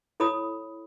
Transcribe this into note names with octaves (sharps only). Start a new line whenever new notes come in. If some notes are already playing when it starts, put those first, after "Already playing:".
E4 A4 C#5 B5 D#6